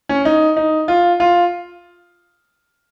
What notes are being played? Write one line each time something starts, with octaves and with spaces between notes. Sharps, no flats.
C#4
D#4
D#4
F4
F4